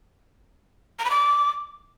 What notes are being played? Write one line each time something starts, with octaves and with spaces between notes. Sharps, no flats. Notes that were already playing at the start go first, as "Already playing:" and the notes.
A#5
B5
D6